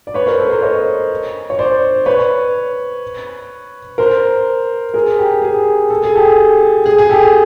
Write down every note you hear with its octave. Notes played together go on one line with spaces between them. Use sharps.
D5
B4 C#5
A#4 C5
A4 B4
A#4 C5
C#5 D#5
C#5
C5 D5
B4 C#5
A#4 C5
G#4 A#4
G4
G#4
A4
G#4
G4 A4
G#4
G#4
G4 A4